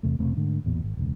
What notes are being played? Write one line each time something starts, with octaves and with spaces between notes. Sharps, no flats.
E2 C3 A3
E1 C3 A3 C4
G#2 D3 A3
A1 E2 A#2
G#1
E1 C#2